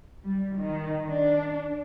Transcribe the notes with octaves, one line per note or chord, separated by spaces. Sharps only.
G3
D#3
D4